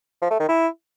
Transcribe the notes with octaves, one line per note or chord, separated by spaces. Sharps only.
F3
A3
D#3
E4